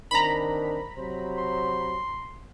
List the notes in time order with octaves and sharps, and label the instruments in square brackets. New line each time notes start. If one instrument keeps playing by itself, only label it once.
[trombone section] D#3 C4 D4 [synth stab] A#5 B5
[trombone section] C3 F#3 C5
[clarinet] C6